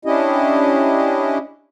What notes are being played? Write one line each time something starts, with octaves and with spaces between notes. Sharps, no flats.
C#4 D4 E4 G4 D#5